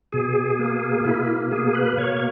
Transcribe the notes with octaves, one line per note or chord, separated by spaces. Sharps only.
B2 G#4
A#3
B2 E4
A#3 G#4
B4
B2 C#5